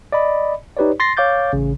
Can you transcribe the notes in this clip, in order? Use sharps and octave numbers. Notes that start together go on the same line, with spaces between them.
D5 D#5 B5
D#4 G4 B4 C#5 D5
C6 A6 A#6 C7
C#5 F5 D6 G6 A6
A1 C#3